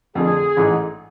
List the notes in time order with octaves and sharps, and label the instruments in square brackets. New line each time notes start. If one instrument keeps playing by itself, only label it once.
[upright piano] F2 D3 A3 [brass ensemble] G#4
[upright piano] A1 G#2 E3 A3